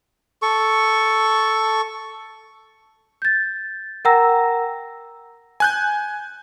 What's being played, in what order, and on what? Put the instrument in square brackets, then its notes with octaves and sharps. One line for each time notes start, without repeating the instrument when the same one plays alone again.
[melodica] A4 C#6
[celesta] G6 A6
A#4 F#5 G5 A#5 E6 A#6
[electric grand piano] G#5 F#6 G6